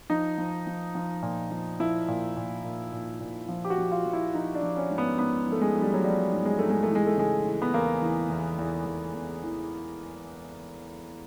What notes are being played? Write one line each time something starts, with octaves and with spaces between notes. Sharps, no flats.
F3 D#4
F3
F3
F3
A#2
F3
F3 E4
A#2
A#2
A#2
A#2
A#2
F3
G4
F#4
F3
F4
F3
E4
F3 D#4
D4
F3
C#4
G#2
B3
G#2 B3
F3 A3
G#3
F3
G3
F#3
F3 G3
G#2
G#3
G#2 A3
G#3
A3
E3
G#3
A3
C#3 G#3
E3
B3
E2 A#3
E3
E2
E2
E2
E2
E3